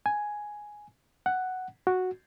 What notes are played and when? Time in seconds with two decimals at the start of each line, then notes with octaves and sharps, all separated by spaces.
0.06 G#5
1.26 F#5
1.87 F#4